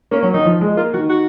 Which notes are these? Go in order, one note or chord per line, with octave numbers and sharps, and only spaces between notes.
A#3 C#4
F#3 C#4
D#3 D#4
F3
G#3
A#3 F4
D#3 F#4
F#4